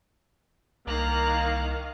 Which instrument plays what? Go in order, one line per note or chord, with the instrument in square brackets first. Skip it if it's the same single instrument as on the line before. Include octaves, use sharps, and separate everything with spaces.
[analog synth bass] C2 [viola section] D#3 F5 [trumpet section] A#3 [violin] A#5 F#6